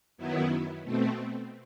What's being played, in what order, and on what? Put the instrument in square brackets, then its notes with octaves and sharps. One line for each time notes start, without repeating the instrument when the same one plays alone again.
[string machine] F#2 D#3 F#3 B3 E4
B2 A3 C4